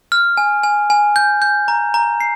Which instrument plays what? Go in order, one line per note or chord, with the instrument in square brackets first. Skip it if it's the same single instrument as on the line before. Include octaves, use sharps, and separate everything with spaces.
[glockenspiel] F6
G#5
G#5
G#5
G6
G6
A#5
A#5
C7